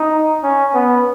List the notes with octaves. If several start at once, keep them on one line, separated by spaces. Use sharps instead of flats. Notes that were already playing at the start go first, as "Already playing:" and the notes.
Already playing: D#4
C#4
B3